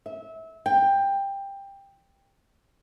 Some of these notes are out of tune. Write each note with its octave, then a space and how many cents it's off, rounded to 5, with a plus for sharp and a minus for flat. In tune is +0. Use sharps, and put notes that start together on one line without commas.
E5 -25
G5 +15